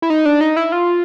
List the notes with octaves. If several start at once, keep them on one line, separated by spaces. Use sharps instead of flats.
E4
D#4
D4
D#4
E4
F4